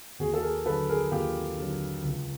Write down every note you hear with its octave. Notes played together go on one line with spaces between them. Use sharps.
D#2 F#4 G#4
A4
G#4 A#4
D3 F#3 A4 B4
G#4 A#4
D#2 F4 G4
D3 F#3
C#2